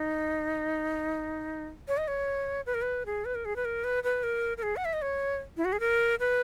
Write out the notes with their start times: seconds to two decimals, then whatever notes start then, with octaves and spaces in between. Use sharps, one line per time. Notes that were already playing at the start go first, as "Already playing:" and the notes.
Already playing: D#4
1.88 C#5
1.97 D#5
2.08 C#5
2.66 B4
2.74 A#4
2.82 B4
3.06 G#4
3.25 B4
3.35 A#4
3.45 G#4
3.56 B4
3.65 A#4
3.84 B4
4.04 B4
4.23 A#4
4.57 A#4
4.63 G#4
4.76 F#5
4.85 E5
4.93 D#5
5.02 C#5
5.57 E4
5.65 F#4
5.73 G#4
5.80 A#4
6.20 B4